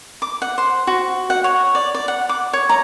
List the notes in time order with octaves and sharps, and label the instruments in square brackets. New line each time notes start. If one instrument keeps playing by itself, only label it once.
[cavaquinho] D6
F#5
C5
F#4
F#5
C#5
D5
D5
F#5
D6
C#5
A#5